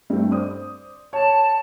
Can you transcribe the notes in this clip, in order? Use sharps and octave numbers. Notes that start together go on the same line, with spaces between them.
G2 A3 C4
C5 D5 D#6
C#5 A5